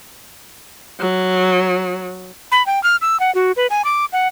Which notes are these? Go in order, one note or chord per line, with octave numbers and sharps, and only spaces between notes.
F#3
B5
G5
F6
E6
F#5
F#4
B4
G#5
D6
F#5